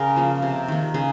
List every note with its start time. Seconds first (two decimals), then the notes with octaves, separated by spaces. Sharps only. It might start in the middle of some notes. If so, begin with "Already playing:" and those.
Already playing: C#3 G#4 A#4
0.16 F3 A#3
0.42 C3
0.68 D#3 A#3
0.94 C#3 G#4